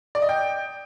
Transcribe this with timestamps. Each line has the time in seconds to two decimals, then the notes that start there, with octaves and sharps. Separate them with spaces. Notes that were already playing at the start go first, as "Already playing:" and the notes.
0.15 D5
0.22 D#5
0.29 G5